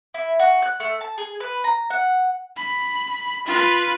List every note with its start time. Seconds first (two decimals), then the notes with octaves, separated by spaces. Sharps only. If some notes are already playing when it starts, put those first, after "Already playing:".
0.14 E4
0.39 F#4
0.62 F#6
0.80 A3
1.01 A5
1.18 G#4
1.40 B4
1.64 A#5
1.90 F#5
2.57 B5
3.46 F4 B4